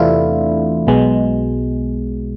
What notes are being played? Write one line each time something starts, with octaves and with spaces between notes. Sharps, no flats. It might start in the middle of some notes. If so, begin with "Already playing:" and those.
Already playing: E2 C3 E3 A3 D4 E4 F4
B1 B2 G#3